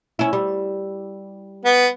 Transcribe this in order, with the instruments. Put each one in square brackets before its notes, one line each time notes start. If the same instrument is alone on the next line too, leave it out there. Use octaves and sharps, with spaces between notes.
[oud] C#4 E4
G3
[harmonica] B3